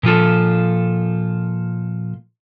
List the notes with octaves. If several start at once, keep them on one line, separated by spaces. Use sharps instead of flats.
A#2 F3 F4 A4